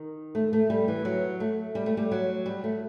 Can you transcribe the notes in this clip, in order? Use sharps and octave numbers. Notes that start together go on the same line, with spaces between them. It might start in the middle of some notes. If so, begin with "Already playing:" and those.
Already playing: D#3
A3
A3
G3
E3
F#3
A3
G3
A3
G3
F#3
G3
A3